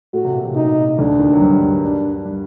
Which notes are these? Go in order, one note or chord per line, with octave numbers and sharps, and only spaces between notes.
A2 A3 F#4
C3
A#2
C3
C3 D#4
D2 D3 D4
D#2 D#3
F#3
G2 G3
G2 G3
D4
G3